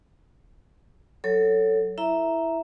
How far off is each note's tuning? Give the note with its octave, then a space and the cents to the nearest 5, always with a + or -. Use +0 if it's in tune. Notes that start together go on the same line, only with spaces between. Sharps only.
F#3 +10 A4 +10 C#5 +0
E4 +0 E5 +0 A#5 +0